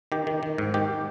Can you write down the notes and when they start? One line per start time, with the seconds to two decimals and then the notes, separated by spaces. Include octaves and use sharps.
0.12 D#3 G4
0.27 D#3
0.43 D#3
0.58 G#2
0.74 D#3 G4